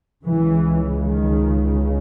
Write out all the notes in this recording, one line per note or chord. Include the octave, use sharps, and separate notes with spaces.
C#2 C#3 E3
D#3